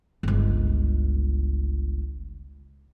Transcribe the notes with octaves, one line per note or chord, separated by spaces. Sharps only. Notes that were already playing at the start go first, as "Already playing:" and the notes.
G1 C#2